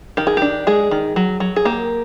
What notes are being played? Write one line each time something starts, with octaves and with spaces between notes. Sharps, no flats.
D#3 G4
G#4
D4 G4
G#3 G#4
D#3
F#3
F#3
G#4
A#3 G4